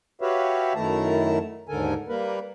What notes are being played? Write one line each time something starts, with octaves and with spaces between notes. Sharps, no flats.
F#4 G4 B4 C#5 E5 F5
F#2 D#3 A3 E4 A5 A#5
D#2 G#2 D3 A4 A#4 G#5
G3 A#3 A#4 B4